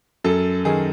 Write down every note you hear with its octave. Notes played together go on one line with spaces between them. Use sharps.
F#2 A4
D#3 G#4